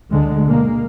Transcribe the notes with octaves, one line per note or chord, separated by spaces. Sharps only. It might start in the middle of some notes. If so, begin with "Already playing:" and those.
D2 D3 G#3
B2 G#3 A#3